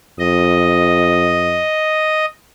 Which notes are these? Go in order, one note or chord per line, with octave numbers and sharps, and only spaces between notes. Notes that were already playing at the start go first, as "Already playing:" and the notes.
F2 D#5